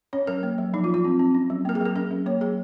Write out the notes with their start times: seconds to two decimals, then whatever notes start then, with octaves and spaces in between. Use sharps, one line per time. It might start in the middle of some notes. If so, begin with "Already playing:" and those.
0.13 C#4 C#5
0.27 F#3 A#4
0.43 A#3
0.58 F#3
0.74 F3 D#4
0.84 F4
0.89 F3
0.94 F4
1.04 C4
1.19 C4
1.35 C#4
1.50 F#3
1.65 A#3 A#4
1.75 G#4
1.81 F#3 A#4
1.96 C#4 A#4
2.11 F#3
2.26 A#3 C#5
2.41 F#3 G#4